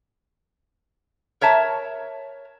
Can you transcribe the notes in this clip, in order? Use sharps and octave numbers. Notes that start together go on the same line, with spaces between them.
A#4 C#5 E5 A5